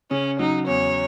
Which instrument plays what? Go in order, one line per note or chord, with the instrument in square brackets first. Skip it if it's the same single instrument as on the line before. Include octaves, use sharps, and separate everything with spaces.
[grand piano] C#3 [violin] C#4
[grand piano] F#3 [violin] D#4
[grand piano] E2 [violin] C#5